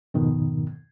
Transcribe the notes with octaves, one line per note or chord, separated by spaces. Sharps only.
F2 G#2 B2 D#3